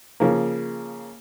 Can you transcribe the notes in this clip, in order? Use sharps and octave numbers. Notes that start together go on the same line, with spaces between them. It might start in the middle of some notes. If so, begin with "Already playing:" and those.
C#3 F3 A#3